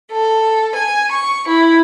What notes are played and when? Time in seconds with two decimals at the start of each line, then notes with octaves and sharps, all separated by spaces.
0.13 A4
0.76 G#5
1.12 C#6
1.48 E4